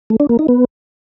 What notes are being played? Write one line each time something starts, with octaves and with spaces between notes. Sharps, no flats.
A3
D4
A#3
D#4
B3